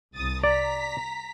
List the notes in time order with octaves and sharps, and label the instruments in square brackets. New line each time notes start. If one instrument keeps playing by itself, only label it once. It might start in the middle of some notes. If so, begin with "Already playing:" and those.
[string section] C2 D#6 A6
[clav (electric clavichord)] D5 [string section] A#5 B6